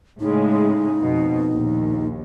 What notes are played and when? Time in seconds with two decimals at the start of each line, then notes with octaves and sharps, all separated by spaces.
0.20 A2 C#3 G#3 D#4
1.03 F2 B2
1.50 A#1 D#2